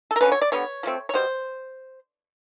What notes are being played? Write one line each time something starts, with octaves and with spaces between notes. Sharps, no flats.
A4
A#4
D3 F3 A#3 C#4 B4
C#5
D5
D3 G3 B3 C#5
F3 A3 C4
C#5
B2 G3 C5